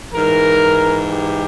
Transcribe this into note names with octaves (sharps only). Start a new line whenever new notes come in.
G#2 E3 A#4
G4